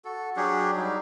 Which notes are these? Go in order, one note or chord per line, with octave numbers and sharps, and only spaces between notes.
F#4 A4
F#3 D4 G4 G#4
G3 D#4 G4